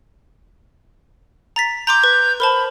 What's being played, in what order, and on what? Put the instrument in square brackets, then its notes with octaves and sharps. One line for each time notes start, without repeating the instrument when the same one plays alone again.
[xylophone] A#5 A6 B6
[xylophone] A#5 C6 D6 [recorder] G6
[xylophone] B4
[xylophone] A#4 C5 A5 [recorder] B5